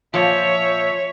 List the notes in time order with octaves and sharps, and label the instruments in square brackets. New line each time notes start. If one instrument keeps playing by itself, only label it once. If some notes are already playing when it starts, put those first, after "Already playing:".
[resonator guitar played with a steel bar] A#2 F3 [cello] C#5 [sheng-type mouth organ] E5